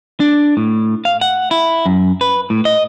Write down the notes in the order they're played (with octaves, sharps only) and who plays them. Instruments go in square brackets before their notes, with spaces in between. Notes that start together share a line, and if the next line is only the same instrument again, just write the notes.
[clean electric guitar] D4
A2
F5
F#5
E4
F#2
B4
A2
D#5